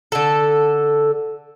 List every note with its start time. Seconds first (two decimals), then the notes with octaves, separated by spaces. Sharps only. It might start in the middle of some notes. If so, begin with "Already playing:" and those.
0.12 D3 A4